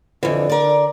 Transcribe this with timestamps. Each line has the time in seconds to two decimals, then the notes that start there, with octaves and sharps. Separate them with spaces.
0.23 F2 D3 E3
0.50 A#4 D5